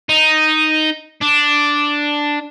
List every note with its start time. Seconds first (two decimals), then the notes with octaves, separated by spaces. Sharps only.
0.09 D#4
1.21 D4